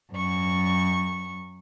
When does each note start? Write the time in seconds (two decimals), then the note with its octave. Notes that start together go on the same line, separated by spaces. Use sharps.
0.13 F#2 C#6